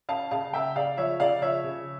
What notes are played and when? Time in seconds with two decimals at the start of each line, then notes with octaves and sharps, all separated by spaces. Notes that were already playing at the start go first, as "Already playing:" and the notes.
0.09 C#4 F5 A5
0.31 C#3 F5 A5
0.53 C#3 E5 G5
0.76 C#3 D5 F5
0.97 F3 C#5 E5
1.20 C#3 D5 F5
1.42 F3 C#5 E5
1.64 C#3